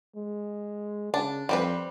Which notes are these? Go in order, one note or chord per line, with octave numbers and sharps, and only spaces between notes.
G#3
C#3 D4
F2 G3 C4 B4